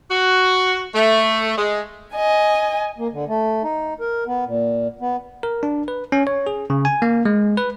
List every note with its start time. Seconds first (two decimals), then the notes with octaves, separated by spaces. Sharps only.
0.11 F#4
0.94 A3
1.58 G#3
2.13 D#5 G#5
2.98 A#3
3.13 D3
3.28 A3
3.64 D#4
4.00 A#4
4.27 B3
4.46 A#2
5.01 B3
5.43 A#4
5.63 D4
5.88 B4
6.12 C#4
6.27 C#5
6.47 G#4
6.70 C#3
6.85 G#5
7.02 A#3
7.25 G#3
7.57 B4